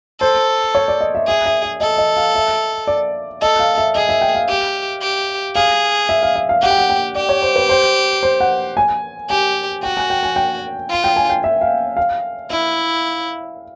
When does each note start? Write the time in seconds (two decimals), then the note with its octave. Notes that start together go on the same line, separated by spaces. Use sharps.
0.21 A4 C5
0.75 C#5
0.88 D5
1.01 D#5
1.15 E5
1.27 G#4 E5
1.46 E5
1.63 E5
1.81 A4 D#5
1.98 D#5
2.17 F5
2.35 E5
2.87 D5
3.42 A4 D#5
3.59 F5
3.78 E5
3.95 G#4 D#5
4.09 E5
4.21 G5
4.35 F5
4.49 G4
5.02 G4
5.55 G#4 F5
6.09 E5
6.23 F5
6.36 E5
6.49 F5
6.62 G4 F#5
6.70 G5
6.78 F#5
6.90 G5
7.15 G4 D5
7.29 C#5
7.42 C5
7.56 B4
7.69 C5
8.23 C5
8.40 F#5
8.77 G#5
9.30 G4 G#5
9.83 F#4 G5
9.97 G#5
10.10 G5
10.23 G#5
10.36 G5
10.90 F4
11.04 G5
11.16 G#5
11.30 G5
11.44 E5
11.61 F5
11.97 F5
12.50 E4 E5